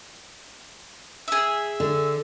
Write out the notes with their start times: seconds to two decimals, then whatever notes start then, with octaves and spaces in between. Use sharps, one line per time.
1.28 G#4 E5
1.80 D3